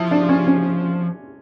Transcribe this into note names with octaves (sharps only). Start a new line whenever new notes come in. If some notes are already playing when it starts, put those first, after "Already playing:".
Already playing: F3 E4
D4
C#4
C#4